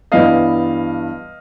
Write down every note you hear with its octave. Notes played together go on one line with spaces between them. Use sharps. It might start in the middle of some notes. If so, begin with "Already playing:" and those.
G2 E3 G3 B3 D#5 F5